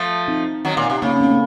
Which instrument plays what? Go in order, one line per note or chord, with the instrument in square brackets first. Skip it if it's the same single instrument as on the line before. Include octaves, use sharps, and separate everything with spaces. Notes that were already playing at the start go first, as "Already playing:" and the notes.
Already playing: [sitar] F3 A3
[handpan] C4 D#4
[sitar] D#3 F#3
A#2
C3
[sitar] C#3 [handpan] A#3 C#4
[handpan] C#4
A3 C4
A#3 C#4